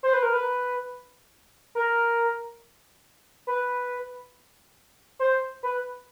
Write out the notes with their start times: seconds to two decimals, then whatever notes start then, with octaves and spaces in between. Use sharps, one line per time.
0.03 C5
0.13 B4
0.23 A#4
0.33 B4
1.75 A#4
3.47 B4
5.19 C5
5.63 B4